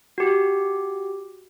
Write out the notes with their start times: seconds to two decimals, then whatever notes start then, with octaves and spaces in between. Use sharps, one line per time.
0.18 F#4 G4